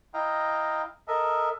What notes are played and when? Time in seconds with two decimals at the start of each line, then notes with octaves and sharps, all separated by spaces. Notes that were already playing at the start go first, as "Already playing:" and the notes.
0.14 E4 D#5 F5 G5 A#5
1.08 A4 A#4 D#5 E5